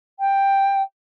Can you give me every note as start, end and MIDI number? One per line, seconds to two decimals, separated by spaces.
0.19 0.82 79